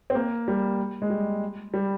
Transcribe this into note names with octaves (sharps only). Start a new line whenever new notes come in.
C4
A#3
G3
G#3
G3
G3